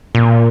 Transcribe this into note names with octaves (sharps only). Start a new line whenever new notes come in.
A#2